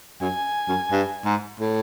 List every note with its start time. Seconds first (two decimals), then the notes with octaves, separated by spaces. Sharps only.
0.21 F#2 G#5
0.68 F#2
0.91 G2
1.25 G#2
1.60 A2